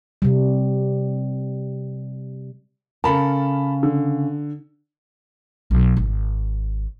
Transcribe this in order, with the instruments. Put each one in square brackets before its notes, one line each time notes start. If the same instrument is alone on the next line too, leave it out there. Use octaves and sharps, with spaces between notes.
[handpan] C3 G3
[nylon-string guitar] C#3 A4 A#4 [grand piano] A5 B5
[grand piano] D3
[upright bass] B1
G#1